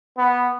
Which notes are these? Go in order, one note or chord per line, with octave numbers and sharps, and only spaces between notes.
B3